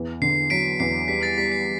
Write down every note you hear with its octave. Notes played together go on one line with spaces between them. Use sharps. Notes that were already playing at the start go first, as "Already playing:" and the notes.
Already playing: E2
D3 C7
F#3 B6 D7
E2 C7
G3 B6
A6
G3 B6
C7